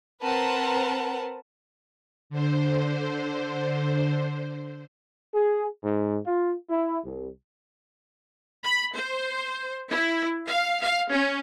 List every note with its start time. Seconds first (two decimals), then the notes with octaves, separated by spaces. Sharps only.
0.23 C4 A#4 B4 F#5 A5
2.30 D3 C5
5.35 G#4
5.84 G#2
6.26 F4
6.69 E4
7.05 C2
8.63 B5
8.94 C5
9.89 E4
10.47 F5
10.81 F5
11.10 C#4